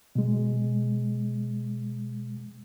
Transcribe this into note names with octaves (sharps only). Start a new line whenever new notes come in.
B2 G#3